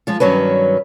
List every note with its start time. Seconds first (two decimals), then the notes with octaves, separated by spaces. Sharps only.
0.07 F3 G#3 F4
0.20 G2 D#3 F#3 C#4 B4